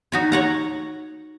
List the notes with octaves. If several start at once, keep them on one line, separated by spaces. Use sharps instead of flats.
D#4 F#4 C#5
C#5 F#5 A#5